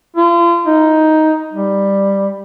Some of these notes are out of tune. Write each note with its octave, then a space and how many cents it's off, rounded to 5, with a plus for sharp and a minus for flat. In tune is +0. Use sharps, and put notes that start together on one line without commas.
F4 -35
D#4 +10
G3 +10